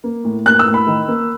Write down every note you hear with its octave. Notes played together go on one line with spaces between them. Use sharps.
A#3
A2
A#3 F#6
E6
A2
B5
D#3
A#3